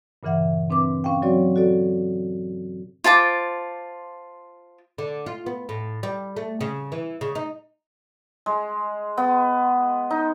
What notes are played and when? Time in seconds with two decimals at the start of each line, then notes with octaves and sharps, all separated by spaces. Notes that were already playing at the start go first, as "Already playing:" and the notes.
0.23 G2 A#2 C#3 E3 E5 F#5
0.70 C4 D4 B4 D6
1.04 C#4 F5 G5
1.22 F#3 C4 F#4 C#5 D5
1.56 F#4 A4 D5
3.04 F4 C5 A5 D6
4.98 D3
5.26 F4
5.46 B3
5.69 A2
6.03 G3
6.37 A3
6.61 C#3
6.92 E3
7.21 C#3
7.35 D#4
8.46 G#3
9.17 B3
10.11 D#4